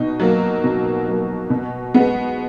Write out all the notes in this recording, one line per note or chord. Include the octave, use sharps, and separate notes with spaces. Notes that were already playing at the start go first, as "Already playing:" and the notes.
Already playing: B2 D#4
F#3 A#3
B2
F#3 A#3
B2
G#3 B3